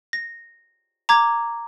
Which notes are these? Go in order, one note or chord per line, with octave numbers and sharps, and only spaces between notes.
A#6
A#5 D6 G#6